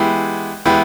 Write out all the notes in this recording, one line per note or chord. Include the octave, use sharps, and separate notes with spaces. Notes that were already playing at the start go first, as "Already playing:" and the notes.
Already playing: E3 G#3 B3 E4 G4
E3 G#3 B3 E4 G4